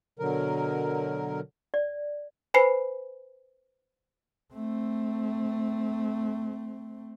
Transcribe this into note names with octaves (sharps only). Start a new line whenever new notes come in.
B2 D3 F#3 A#4
D5
B4 C5 G#5 B5 C7
A3 C4